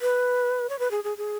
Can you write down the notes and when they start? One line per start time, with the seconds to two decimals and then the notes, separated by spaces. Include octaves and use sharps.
0.01 B4
0.69 C#5
0.79 B4
0.91 G#4
1.04 G#4
1.18 G#4